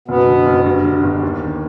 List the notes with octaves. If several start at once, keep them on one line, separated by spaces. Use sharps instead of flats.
F#1 B2 B3
D3
F#1
G2
D3
G1
D#2
D#2